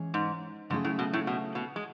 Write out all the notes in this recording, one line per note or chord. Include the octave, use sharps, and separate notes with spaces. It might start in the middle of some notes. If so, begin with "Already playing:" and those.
Already playing: E3 G#3 C#4 G#4 C#5
G#2
G#2 C#3 F#3 A3 E4 G#4
A2
B2
A2
B2
B2
G#3